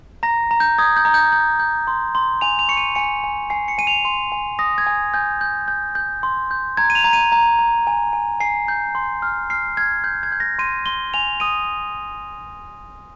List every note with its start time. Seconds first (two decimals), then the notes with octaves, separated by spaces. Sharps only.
0.23 A#5 A#6
0.51 A#5
0.60 G6
0.78 D#6 G#6
0.96 G6
1.05 A#5
1.14 G6
1.32 G6
1.59 G6
1.87 C6
2.15 C6
2.41 G#5 F7
2.59 F7
2.69 C#6 C#7
2.77 D#7
2.95 G#5 C#7
3.24 G#5
3.50 G#5 C7
3.68 C#7
3.78 G#5 D#7
3.87 F7
4.05 C6
4.32 G#5
4.59 D#6 A#6
4.78 G#6
4.87 G#5
5.14 G#5 G6
5.41 G6
5.68 G6
5.95 G6
6.23 C6
6.51 G6
6.77 A#5 G#6
6.90 D#7
6.95 F7
7.04 A#5
7.13 D#7
7.32 A#5
7.59 A#5
7.87 G#5
8.13 G#5
8.40 G#5 C7
8.68 G6
8.95 C6
9.22 F6
9.50 F6 C7
9.77 F6 G#6
10.04 G6
10.23 G#6
10.32 G6
10.40 A#6
10.59 C6 D#7
10.86 C6 G7
11.14 G#5 F7
11.40 D#6 D#7